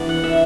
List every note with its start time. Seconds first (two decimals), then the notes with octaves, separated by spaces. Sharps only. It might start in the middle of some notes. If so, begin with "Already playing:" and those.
Already playing: E3 B3 D4 D5
0.09 F#5
0.24 E5